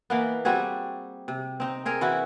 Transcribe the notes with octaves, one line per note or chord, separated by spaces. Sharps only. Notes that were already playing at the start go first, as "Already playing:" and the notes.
E3 A#3 B3
G3 C4 F#4 G#4
C3
C4 D#4
C4 G#4 A#4
E3 E4 F#4